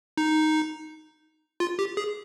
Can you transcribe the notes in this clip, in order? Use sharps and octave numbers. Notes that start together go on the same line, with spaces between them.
D#4
F4
G4
G#4